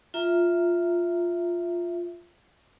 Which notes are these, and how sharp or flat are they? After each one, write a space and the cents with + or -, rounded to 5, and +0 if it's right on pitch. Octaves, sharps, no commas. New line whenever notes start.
F4 +0 E5 +0 A#5 +0